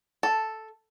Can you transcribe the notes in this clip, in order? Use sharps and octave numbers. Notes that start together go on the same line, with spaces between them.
A4